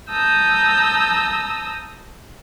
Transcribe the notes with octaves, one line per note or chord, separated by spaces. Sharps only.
A5 A#5 D#6 E6 G6